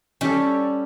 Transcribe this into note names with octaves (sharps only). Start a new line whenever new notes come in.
G3 C#4 G4 A4